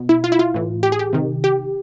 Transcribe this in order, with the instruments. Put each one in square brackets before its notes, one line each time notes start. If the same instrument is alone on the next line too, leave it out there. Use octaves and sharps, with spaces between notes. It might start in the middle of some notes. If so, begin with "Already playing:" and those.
Already playing: [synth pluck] B2
E4
F4
E4
F4
A2 E3
G4
G#4
G4
C3 D#3
G4